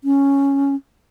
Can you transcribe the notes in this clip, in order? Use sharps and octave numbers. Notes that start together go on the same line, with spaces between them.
C#4